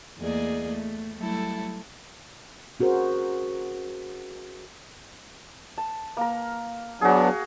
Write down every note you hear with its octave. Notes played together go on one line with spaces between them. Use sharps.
E2 A3 A#3 G#4 D5 D#5
A3
F#3 G3 A3 E4 A4
C#4 F#4 G#4 A#4 C5
A5
A#3 A#4
F#3 B3 D4 F#4 G#4